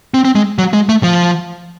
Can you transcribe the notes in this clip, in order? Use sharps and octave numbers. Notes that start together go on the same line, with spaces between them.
C4
C4
G#3
F#3
G#3
A3
F3